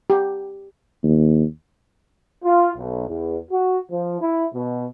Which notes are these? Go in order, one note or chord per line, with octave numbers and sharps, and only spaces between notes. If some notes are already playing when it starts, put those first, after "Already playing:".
G4
D#2
F4
B1
E2
F#4
F3
E4
B2